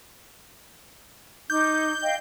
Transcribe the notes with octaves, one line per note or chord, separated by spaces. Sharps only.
D#4 D6 G6
D#5 F5 G5